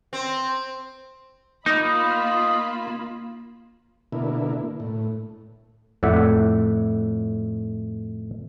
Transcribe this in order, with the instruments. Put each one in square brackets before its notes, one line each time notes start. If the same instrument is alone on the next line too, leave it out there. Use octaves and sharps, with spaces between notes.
[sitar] C4
[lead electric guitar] A#3 [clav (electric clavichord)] D#4 [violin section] F4 B5 [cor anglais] D#5
[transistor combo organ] B2 D3 A#3 E4
A2
[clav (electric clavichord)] F2 A2 D5 E5 F#5